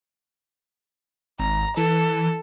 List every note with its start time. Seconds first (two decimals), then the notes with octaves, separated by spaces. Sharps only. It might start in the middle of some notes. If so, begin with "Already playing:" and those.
1.39 G#1 A#5
1.77 E3 A4